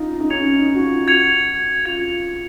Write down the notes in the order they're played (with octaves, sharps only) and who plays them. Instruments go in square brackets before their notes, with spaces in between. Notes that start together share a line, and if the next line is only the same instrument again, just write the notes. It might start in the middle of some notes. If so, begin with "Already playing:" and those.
Already playing: [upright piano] D#4 F4
D#4
[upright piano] C#4 [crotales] G#6 C#7 F7
[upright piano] D#4
F#4
F4
[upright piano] F#4 [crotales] G#6 C#7 F7
[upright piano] F4 [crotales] G#6 C#7 F7